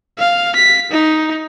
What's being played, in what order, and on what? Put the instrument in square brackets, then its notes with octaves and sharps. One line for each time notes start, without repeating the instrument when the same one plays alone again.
[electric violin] F5
B6
D#4